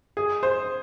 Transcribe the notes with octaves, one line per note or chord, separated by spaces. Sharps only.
G#4
C5